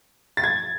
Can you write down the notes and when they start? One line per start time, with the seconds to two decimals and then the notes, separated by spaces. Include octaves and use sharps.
0.37 A6
0.44 G#6